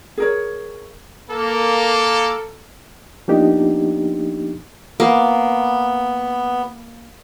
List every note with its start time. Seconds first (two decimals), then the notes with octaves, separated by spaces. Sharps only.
0.17 G#4 A#4 C#5
1.30 A#3 A4
3.28 F3 A#3 B3 D4 D#4 G4
5.00 A#3 B3